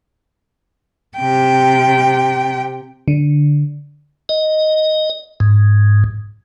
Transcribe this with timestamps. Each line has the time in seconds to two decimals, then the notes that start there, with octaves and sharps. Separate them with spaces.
1.18 C3 G5
3.08 D3
4.29 D#5
5.40 G#2